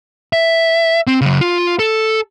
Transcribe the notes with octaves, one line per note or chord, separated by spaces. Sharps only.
E5
C4
C#3 F#3
F4
A4